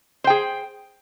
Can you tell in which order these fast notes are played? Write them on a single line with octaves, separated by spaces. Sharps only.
C5 G5 G#4